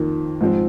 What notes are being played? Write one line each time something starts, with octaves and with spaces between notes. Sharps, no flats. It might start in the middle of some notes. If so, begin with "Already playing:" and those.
Already playing: F2 D#3 A#3 D#4
G#2 F3 C4